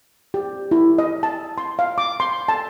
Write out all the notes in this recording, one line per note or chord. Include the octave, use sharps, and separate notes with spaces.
G4
E4
D#5
A5
C6
F5
D6
C6
A5